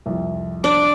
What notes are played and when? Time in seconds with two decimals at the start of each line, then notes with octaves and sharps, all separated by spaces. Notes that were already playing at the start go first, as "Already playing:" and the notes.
0.06 C2 F2
0.64 D4 D6